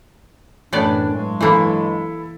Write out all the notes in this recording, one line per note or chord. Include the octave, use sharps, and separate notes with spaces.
F#2 A2 E3 B3 D4 D5
G2 F#3 G#3
E3 A#3 E4 A4 B5